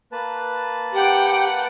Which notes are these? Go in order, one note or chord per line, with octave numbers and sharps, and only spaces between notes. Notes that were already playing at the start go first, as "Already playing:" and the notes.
A#3 B4 A5
G4 F#5 G5